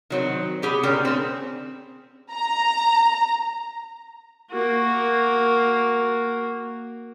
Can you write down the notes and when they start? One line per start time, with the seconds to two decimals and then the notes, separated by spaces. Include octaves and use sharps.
0.10 D#3 F#3 C4
0.62 B3 G4 G#4
0.83 A#2 D3 C#4 A#4 G5
1.05 C4 G#4
2.32 A#5
4.52 A#3 F#4